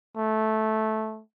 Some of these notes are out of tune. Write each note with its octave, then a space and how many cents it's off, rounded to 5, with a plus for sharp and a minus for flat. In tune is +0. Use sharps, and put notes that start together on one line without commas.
A3 -10